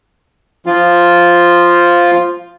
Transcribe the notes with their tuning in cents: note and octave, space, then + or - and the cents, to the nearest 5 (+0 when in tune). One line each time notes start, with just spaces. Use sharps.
F3 +0 F4 +0